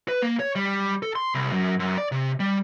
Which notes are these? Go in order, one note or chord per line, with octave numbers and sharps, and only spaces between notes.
B4
A#3
C#5
G3
A4
C6
C2
F#2
F#2
D5
C3
G3